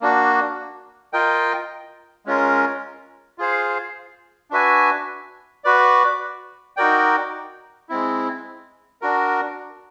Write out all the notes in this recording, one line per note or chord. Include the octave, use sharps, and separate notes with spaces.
A#3 D4 F#4
F4 A#4 D#5 G5
G#3 C#4 F4 A#4
F4 G#4 C5 F5
D4 F#4 B4 E5 G#5
F#4 B4 D5
D#4 F#4 A#4 D5 G5
G#3 C4 E4
D4 F#4 A#4